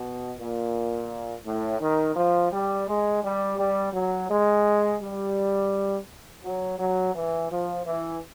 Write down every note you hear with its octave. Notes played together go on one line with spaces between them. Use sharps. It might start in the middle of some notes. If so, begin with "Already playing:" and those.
Already playing: B2
A#2
A2
D#3
F3
G3
G#3
G3
G3
F#3
G#3
G3
F#3
F#3
E3
F3
E3